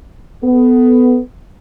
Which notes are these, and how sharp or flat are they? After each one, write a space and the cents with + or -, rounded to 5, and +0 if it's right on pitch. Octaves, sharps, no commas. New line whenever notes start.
B3 +15 A4 +0